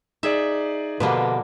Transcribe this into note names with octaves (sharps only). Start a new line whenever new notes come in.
D#4 G#4 D5 E5
B2 D3 F3 G3 A#3 G4 B4